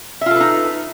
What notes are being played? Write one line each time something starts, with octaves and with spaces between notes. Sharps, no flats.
D#4 F4 A4 B4 E5